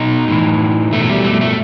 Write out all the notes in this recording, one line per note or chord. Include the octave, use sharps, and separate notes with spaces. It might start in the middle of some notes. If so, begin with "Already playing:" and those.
Already playing: B2 D#4
A2 E3
B2 A3
G3
A3
A3